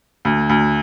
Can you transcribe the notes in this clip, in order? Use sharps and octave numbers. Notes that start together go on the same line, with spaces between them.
D2
D2